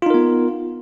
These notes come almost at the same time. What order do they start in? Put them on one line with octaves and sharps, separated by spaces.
F4 D#4 A#4 B3